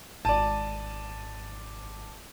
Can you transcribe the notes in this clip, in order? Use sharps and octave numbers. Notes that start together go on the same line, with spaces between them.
G#1 D5 A5 D#7